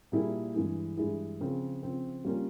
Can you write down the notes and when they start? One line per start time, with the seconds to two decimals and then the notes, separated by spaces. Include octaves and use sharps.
0.12 A#2 G3 A#3 E4 G#4
0.54 G2 E3 G#3 E4 G#4
0.97 G2 E3 G#3 E4 G#4
1.41 C#3 F3 C4
1.83 C#3 F3 C4
2.25 G3 A#3 C#4 F4